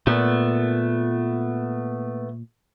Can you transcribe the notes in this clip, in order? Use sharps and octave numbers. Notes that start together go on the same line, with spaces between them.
A#2 A3 B3